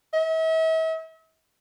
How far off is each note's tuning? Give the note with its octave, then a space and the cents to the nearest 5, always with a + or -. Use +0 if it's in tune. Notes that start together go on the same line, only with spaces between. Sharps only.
E5 -40